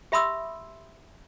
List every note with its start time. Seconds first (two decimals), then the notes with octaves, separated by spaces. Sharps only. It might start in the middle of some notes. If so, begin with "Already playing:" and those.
0.12 G4 E5 B5 C6 D#6 E6